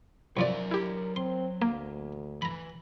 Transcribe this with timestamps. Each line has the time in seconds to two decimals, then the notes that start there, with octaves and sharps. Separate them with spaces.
0.37 C2 F3 F#3 A#4 D5 E5
0.71 E4 G4
1.16 C4 C6
1.62 D2 A#3
2.42 E3 A#5 B5